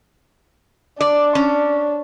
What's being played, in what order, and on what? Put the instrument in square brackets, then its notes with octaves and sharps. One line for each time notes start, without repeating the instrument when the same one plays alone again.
[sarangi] D4 [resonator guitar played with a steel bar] D5
[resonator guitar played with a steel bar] C#4